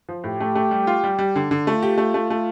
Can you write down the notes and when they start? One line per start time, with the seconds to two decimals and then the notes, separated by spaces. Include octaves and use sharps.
0.09 F3
0.24 A2 G4
0.40 A3
0.55 A3
0.71 G3
0.87 F4
1.04 G3
1.19 G3
1.36 D3
1.51 D3
1.67 A3 F4
1.83 G4
1.98 A3
2.14 A3
2.30 A3